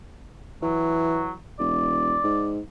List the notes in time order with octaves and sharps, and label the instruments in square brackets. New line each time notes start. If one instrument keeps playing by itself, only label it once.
[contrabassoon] E3 [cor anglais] F#3
[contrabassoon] E1 [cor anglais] D5
[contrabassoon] G#2